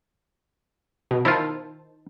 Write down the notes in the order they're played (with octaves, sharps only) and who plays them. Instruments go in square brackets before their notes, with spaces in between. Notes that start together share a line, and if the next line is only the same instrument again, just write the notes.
[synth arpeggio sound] B2
[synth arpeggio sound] D#3 C5 A5 [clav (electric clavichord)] E4 F4